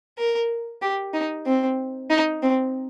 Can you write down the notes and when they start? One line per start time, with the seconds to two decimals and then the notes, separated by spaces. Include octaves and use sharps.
0.18 A#4
0.82 G4
1.14 D#4
1.46 C4
2.10 D#4
2.42 C4